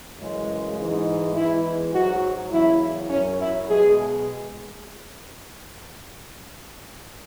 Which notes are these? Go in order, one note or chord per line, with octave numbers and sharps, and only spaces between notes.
F#2 C#3 E3 G#3
G#2 E3 G#3
E2 E3 G#3 E4
G#2 F#3 F#4
E2 C#3 F#3 E4
F#2 F#3 C#4
E4
B2 G#3 G#4